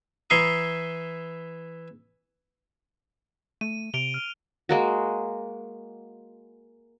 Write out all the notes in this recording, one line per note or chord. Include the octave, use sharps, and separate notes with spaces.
E3 E4 A#5 C6 C#6 D#6
A3 D#7
C3 D7 F7 G7
F6
G#3 A#3 F#4